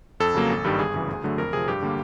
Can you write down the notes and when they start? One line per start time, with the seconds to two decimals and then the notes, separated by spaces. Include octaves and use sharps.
0.20 F2 A4
0.35 C#3 F#3 A#3
0.50 G#1
0.64 G2 D#3 G3
0.79 G1 G#4
0.94 F#2 C#3 E3
1.08 D2
1.24 D3 F#3 A3
1.38 F2 A#4
1.53 C3 F3 G#4
1.68 G2 G4
1.83 D3 G3 A#3